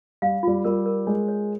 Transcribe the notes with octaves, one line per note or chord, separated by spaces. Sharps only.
G3 F5
G3 F4
G3 A#4
A#4
G#3 C#5
C#5